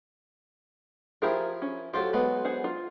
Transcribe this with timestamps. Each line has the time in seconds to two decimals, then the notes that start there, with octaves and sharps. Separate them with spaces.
1.22 F3 E4 G4 G#4 A#4
1.62 C#4
1.94 F#3 F4 G4 A4 C5
2.13 F#3 G#3 B3
2.45 G#4 C5 F#5
2.64 F4